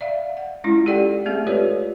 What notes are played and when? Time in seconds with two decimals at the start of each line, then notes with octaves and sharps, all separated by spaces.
0.01 D5 E5 F5
0.37 F#5
0.64 G#3 C#4 E4 F4
0.86 G4 A4 D5 F#5 G5
1.25 G#3 A3 C4 G#4 E5
1.47 F4 G4 A4 B4 C#5 D5